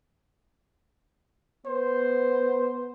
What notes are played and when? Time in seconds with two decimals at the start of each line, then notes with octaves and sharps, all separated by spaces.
1.66 B3 C5